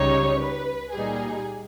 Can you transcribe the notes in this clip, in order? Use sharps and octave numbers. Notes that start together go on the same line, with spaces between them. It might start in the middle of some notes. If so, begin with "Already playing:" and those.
Already playing: C#2 C#3 G3 D#4 C#5
B4
A#2 G3 A#3 D#4 G#4